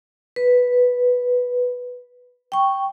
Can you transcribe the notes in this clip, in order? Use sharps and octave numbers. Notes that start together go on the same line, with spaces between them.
B4
G5 C#6